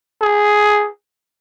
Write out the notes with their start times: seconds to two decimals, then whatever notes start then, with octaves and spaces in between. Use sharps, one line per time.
0.22 G#4